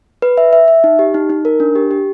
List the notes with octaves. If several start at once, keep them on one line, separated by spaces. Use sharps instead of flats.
B4
E5
E5
E5
D#4
G4
D#4
D#4
A#4
D4
G4
G4